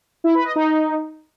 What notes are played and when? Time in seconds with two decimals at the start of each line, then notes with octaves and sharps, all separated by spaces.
0.24 E4
0.35 B4
0.45 D#5
0.56 D#4